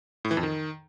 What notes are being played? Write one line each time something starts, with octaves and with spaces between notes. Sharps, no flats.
A2
E3
F2
D#3